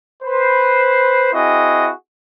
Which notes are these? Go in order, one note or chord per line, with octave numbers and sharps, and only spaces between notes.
B4 C5
C4 E4 F#4 G#4 D#5